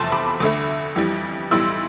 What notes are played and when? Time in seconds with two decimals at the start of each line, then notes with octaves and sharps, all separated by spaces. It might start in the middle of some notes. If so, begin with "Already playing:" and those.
Already playing: F1 E2 C3 F3 A3 A5 C6
0.12 B5 D6
0.40 D2 D3 A3
0.96 F2 E3 G3
1.51 B1 A2 E3 G3 C6 E6